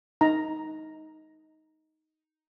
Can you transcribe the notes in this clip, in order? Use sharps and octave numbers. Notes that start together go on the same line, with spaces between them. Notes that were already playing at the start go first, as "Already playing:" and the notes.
D#4 A#5